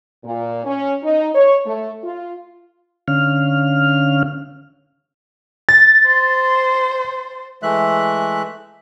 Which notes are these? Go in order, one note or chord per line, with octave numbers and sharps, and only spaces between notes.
A#2
C#4
D#4
C#5
A3
F4
D3 C#4 F5 F6
A6
C5
E3 G#3 A3 E5 F#6